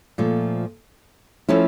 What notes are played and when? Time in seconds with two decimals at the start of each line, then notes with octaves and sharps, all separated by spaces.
0.18 A#2 F3 A3
1.49 F3 A3 C#4 E4